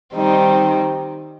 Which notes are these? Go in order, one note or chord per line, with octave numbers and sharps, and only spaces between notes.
D#3 G3 C4 D#4